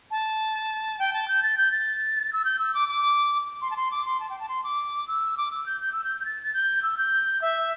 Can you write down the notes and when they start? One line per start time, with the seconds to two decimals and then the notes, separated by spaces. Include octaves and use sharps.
0.11 A5
0.99 G5
1.13 A5
1.28 G6
1.43 A6
1.58 G6
1.72 A6
2.33 E6
2.45 G6
2.59 E6
2.75 D6
2.88 D6
3.62 C6
3.71 A5
3.77 C6
3.91 D6
4.05 C6
4.20 A5
4.30 G5
4.40 A5
4.49 C6
4.64 D6
5.08 E6
5.38 D6
5.52 E6
5.66 G6
5.81 G6
5.92 E6
6.04 G6
6.20 G6
6.25 A6
6.43 A6
6.54 G6
6.83 E6
6.98 G6
7.42 E5